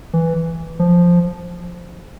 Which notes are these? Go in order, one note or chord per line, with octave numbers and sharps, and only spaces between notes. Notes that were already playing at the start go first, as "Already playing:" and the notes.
E3
F3